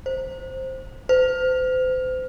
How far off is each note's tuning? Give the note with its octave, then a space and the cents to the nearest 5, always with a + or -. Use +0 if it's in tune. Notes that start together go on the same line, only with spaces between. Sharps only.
C5 +10
C5 -35